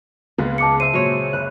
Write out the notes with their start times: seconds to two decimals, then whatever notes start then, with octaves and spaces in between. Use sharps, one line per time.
0.38 C#2 G#3 A#3 B3
0.58 A5 D6 C#7
0.80 C5 E5 D#7
0.93 A#2 F#3 G#3 C#5
1.33 F#1 F#6